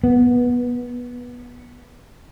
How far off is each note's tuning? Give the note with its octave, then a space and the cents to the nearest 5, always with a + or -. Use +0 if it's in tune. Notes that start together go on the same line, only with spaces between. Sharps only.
B3 -15